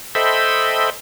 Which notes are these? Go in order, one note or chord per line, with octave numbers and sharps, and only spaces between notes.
A4 C5 D#5 E5 G5 B5